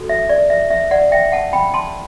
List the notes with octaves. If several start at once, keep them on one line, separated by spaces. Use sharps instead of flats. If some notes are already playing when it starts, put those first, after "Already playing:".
Already playing: F#4 A4
E5
D5
E5
E5
D5 F#5
E5 G5
F#5 A5
G5 B5
A5 C6